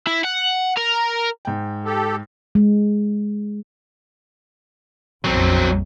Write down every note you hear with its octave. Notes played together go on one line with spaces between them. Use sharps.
E4
F#5
A#4
G#2 G5
G4 A4
G#3
A#1 F2 F#3 C4